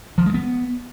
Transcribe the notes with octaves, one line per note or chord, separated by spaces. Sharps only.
F3
G#3
B3